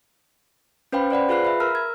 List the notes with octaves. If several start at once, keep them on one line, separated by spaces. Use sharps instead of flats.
C#4 B4 C5 F5 G5 B5
C5 D5 F#5 B5
F4 G#4 B4 F5 F#6 C7
E5 B5
A#4 A#5 E6 F6
G#6